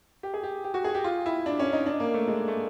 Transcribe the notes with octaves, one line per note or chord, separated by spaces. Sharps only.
G4
G#4
G4
G4
F#4
G#4
G4
F4
E4
D4
C#4
D#4
D4
A#3
A3
G#3
A3